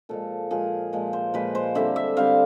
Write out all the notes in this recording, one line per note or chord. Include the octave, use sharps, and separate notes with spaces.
A#2 F3 G#3 A4
A#2 F3 G#3 G#4
A#2 F3 G#3
C5
A#2 F3 G#3 B4
C5
D3 G3 C4 E5
E5
D3 G3 C4 F5